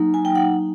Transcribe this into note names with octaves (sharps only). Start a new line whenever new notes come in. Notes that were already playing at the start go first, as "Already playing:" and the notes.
Already playing: F#3 A#3 D#4
G#5
G5
F#5